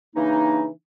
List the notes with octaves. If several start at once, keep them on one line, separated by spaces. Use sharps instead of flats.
C#3 E3 A#3 D4 D#4